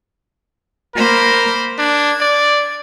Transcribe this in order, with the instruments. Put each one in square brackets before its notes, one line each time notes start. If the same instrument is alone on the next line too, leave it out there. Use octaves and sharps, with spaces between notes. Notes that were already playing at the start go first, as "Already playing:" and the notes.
[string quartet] A#3 C5 B5 [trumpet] A#4
[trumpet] D4 [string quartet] G#6
[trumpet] D5